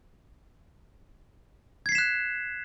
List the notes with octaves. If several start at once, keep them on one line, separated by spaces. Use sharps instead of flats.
F#6 G#6 B6 C7 E7